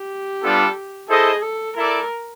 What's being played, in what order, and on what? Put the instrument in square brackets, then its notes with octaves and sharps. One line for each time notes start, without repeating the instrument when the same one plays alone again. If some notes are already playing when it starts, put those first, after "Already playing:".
Already playing: [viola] G4
[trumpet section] G3 B3 D4 F4 A4
[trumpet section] E4 A4 C5 D#5 [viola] G#4
[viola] A4
[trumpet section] E4 A4 D5 [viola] A#4